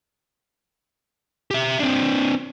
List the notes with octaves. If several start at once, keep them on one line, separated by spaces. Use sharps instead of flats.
G4 E5
C4 D4